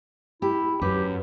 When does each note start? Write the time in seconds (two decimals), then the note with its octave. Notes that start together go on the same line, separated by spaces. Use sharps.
0.42 E4 G4
0.82 F#2 G4 B4